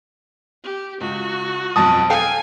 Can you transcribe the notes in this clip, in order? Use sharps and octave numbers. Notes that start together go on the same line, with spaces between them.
G4
C#2 F#4
B1 F2 F3 A5 D#6
A4 F5 G5 G#5